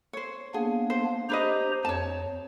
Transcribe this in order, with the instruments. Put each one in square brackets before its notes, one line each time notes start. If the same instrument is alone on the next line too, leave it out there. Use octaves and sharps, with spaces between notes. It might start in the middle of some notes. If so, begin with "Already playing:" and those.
[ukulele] C5 C#5
[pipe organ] A#3 B3 D4 [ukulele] G#4
[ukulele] C5
[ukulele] D4 B4 D#5 [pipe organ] G4 C5 A#5
[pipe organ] F2 [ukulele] C#5 A5